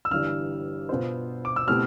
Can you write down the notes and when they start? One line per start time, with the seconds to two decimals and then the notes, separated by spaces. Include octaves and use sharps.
0.05 E6
0.11 G1 G2 E3 G3 F6
0.89 B2 B3 F4 C5
1.45 D6
1.56 E6
1.67 B2 A3 C4 E4 G4 F6